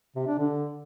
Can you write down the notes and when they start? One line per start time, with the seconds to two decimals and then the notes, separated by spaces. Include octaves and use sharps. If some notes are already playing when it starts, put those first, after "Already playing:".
0.16 C3
0.27 D4
0.39 D3